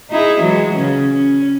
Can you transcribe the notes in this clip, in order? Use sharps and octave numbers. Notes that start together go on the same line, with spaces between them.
D#4 E4 G#4
E3 F#3 G#3
C#3 C#4
C#4